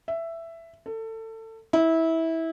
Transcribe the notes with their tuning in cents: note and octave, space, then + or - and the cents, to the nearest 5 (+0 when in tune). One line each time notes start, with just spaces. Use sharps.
E5 +10
A4 +25
E4 -20